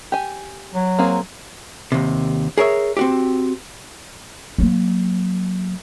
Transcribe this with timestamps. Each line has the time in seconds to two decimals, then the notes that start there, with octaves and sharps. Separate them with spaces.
0.12 G4 G#5
0.74 F#3
0.99 A#3 C4 G#4
1.92 D#2 C3
2.58 G#4 A#4 C#5 E5
2.97 C4 F#4 G4
4.58 F#3 A#3